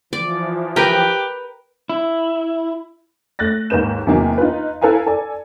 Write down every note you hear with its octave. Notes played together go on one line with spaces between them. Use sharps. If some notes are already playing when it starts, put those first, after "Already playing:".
E3 F3 D5
G4 A#4 B4 G5
E4
A3 F#6 A6 A#6
D#2 G#2 A#4 B4 G6 E7
E2 C3 D#3 F#3 A#3
D#4 F4 B4
E4 A4 B4 F5 G#5 A#5
A4 D5 G#5